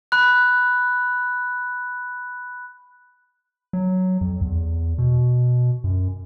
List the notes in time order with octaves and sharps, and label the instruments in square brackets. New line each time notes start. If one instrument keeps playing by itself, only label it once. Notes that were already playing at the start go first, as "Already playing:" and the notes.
[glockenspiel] B5 F#6
[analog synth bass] F#3
F2
E2
B2
F#2